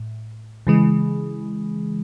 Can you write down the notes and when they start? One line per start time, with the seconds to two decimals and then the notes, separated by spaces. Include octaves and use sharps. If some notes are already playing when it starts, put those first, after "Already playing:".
Already playing: A2
0.67 C#3 E3 G#3